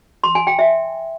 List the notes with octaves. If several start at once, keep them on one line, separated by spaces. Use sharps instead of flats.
C6
G#5
G5
E5